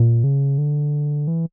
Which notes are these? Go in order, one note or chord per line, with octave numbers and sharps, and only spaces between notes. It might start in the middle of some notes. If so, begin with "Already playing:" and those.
Already playing: A#2
C#3
D3
E3